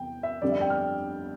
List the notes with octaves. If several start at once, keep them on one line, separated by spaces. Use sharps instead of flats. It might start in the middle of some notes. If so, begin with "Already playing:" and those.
Already playing: E2 C3 G3 B3 G5
E5
G1 F2 D3 G3 D5
E5
G5
F6